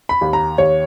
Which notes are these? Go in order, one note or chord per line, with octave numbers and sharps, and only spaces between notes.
B5
D#2
A#5
D#2 C#5